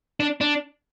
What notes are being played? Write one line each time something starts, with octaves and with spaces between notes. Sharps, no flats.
D4
D4